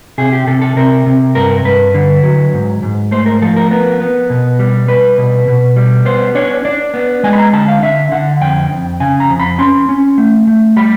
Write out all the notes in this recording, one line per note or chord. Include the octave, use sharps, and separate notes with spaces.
C3 G#4
G4
C3 A4
A4
C3 A#4
C3
G2 A#4
G2 B4
D3
F#3
G#2
G#2
A3 C5
A#4
F3 A4
A#4
B3 A#4
B3
B2
G3
G3 B4
B2
B2
G3
B3 C5
D4 C#5
D4 D5
B3
G#3 G#5
B5
A#5
D3 A5
F5
D3 E5
D3 F#5
F2 G5
F2
C#3 G#5
A#5
F2
B5
C#4 C6
C#4
A3
A3
G3 B5